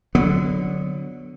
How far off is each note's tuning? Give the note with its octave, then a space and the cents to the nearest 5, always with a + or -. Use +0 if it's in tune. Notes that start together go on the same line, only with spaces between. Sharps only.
D3 +0 F#3 -20 B3 +0